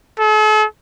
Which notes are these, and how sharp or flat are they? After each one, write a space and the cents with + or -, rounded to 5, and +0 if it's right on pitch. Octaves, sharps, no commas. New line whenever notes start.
A4 -45